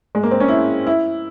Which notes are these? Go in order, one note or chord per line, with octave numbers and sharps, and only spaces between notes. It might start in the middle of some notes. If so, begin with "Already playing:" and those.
G#3
A#3
C4
C#4
E4
E4